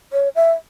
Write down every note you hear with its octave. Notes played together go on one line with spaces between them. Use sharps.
C#5
E5